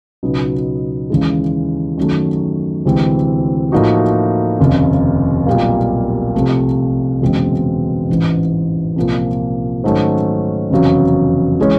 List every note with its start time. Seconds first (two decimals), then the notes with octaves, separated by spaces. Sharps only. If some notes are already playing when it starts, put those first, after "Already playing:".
0.23 C#2 B2 F#3 B3 D#4
1.10 D#2 C#3 E3 G#3
1.98 F#2 D#3 F#3 A3
2.85 D2 C3 E3 G#3 C4
3.72 A2 F3 A#3 D#4 F#4
4.60 F1 D#2 C#3
5.46 B1 A#2 G3 A#3
6.34 C2 C3 F3 A3
7.21 F#1 E2 B2 G#3 C4
8.09 A1 G#2 E3
8.96 C2 A#2 F3 A#3
9.84 G#2 D#3 F#3 A3 C#4
10.70 F1 E2 C#3 F#3
11.60 E3 G#3 C#4